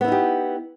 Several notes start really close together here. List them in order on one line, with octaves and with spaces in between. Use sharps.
B3 E4 D#4 G4